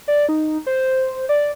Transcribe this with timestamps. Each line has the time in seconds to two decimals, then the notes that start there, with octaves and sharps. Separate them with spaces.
0.08 D5
0.29 D#4
0.66 C5
1.29 D5